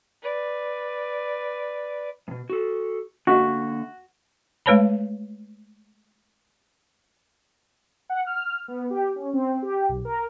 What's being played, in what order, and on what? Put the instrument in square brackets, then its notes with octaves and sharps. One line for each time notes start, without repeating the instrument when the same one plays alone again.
[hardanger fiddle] B4 D5
[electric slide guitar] G2 B2
F#4 A4
[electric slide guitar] D3 A#3 E5 [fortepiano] F#4
[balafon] G#3 A3 B4 C#5 A5 B5
[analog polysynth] F#5
F6
B3
G4
C#4
C4
G4
B1
A#4